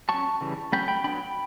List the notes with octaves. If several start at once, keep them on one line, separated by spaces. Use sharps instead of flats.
F#3 C#4 A5 C#6
C#3 E3 G3
F#3 A3 C#4 G5 B5
G5 B5
F#3 B3 D4 G5 B5